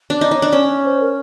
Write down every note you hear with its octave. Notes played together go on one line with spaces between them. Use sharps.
D4
D#4 D5
D#4 C#5
D4
C#4 D5
C5
A#4